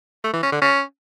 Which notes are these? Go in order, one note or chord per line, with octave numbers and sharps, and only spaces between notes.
A3
E3
C#4
D3
C#4